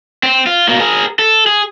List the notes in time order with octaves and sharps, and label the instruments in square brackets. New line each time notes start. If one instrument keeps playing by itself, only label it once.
[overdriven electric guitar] C4
F4
B2 A#3
G#4 A#4
A4
G#4